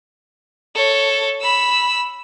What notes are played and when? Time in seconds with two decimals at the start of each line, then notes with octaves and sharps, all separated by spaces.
0.76 A4 C#5
1.42 B5 E6